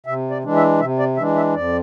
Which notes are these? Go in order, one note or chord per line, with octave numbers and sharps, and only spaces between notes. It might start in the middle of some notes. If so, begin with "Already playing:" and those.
C3 E5
D5
E3 G#3 D4
E5
C3 E5
D5
E3 G#3 D4 E5
E5
F2 D5